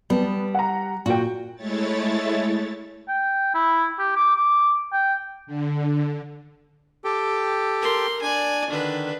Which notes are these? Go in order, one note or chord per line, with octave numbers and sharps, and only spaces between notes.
G3 B3 A5
F#5 A#5
A#2 F#4 G5
G#3 A3 E4 C#5 A6
G5
E4
G4
D6
D6
G5
D3
G4 A4 G5
A#4 C6
D4 D5 G#5
D3 D#3 D4 B4